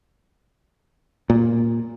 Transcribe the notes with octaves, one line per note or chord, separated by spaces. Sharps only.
A#2